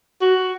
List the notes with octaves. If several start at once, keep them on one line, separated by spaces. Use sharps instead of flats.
F#4